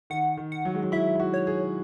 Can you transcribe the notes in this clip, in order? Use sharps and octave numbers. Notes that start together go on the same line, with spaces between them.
D#3 F#5
D#3
F#5
F#3
G#3
F#3
E4 E5
E4
F#4
C#5
G#4